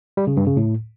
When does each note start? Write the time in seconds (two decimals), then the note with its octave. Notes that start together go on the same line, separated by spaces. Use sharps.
0.17 G3
0.27 C#3
0.37 G2
0.47 C#3
0.57 A2